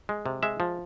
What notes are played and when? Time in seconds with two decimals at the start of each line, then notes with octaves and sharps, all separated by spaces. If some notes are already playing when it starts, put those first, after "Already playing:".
0.09 G#3
0.26 C3
0.43 G#3 E5
0.60 F3